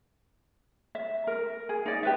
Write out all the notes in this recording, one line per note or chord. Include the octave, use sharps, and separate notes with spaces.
E5
A#4
G#4
D#4 D5
G4 B4 E5